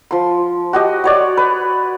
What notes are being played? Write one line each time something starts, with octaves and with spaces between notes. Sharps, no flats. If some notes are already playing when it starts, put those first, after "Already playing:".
F3 C6
F#4 G4 D#5
F#4 C#5 D5
B4